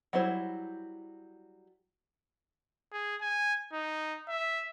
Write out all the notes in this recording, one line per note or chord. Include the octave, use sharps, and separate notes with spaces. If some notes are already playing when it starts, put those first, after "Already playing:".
F#3 G3 E4 C5
G#4
G#5
D#4
E5